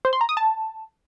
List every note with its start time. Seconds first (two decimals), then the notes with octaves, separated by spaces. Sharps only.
0.05 C5
0.13 C6
0.21 A#5
0.29 D#6
0.37 A5